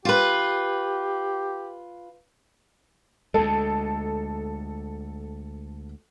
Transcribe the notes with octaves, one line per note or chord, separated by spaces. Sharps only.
F4 G4 B4
D2 G#3 A4